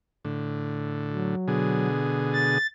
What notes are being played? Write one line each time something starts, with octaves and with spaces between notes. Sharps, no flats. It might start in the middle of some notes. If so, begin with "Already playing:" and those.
A2 D3
F#3
B2 D3 G#4
A6